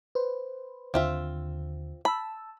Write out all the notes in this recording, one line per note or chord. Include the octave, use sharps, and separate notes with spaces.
B4 C5
D#2 D3 C4 F4 E5
A5 B5 E6